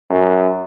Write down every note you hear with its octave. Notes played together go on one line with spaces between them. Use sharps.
F#2